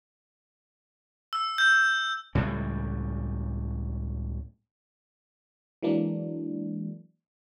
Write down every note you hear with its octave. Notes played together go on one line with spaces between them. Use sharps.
E6
G6
C#2 A2 G3 C#4
E3 F#3 G#3 A#3 D4